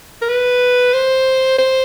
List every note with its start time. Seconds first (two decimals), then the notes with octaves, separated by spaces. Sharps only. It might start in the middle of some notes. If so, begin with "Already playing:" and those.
0.22 A#4
0.29 B4
0.94 C5
1.58 C5